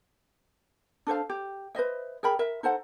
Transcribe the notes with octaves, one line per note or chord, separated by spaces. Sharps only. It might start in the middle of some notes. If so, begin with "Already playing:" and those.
D4 A4 C5 F5
G4
B4 C5 D#5 E5
G#4 A#4 G5 B5
A#4 E5
D#4 A4 C5 F#5